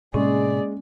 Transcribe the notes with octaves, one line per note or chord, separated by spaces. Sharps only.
A2 C3 G#3 A#3 C#4 G#4 D5